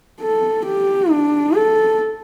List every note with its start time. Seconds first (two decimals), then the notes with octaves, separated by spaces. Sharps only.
0.21 A4
0.66 G4
1.11 D4
1.56 A4